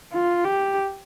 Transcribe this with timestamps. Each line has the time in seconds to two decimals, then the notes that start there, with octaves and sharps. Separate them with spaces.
0.13 F4
0.45 G4